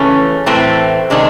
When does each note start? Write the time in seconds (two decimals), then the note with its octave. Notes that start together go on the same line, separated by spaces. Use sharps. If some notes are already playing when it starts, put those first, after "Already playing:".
Already playing: C#3 E3 A3 C#4
0.46 A2 E3 A3 C4
1.10 C3 D#3 G#3 D4